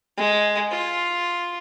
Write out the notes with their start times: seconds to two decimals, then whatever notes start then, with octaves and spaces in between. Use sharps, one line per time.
0.17 G#3
0.71 F4